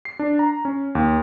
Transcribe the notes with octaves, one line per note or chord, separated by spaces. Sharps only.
C7
D4
A#5
C#4
D#2